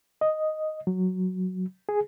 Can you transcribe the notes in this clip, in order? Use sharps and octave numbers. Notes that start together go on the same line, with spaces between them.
D#5
F#3
G#4